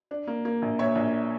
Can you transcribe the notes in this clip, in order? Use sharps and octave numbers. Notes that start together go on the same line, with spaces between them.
D4
A#3
A#3
A#1
A#2 C#5 E5
A#1